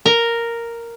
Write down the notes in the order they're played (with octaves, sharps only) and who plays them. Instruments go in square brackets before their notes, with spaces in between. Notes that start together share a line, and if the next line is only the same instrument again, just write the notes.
[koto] A#4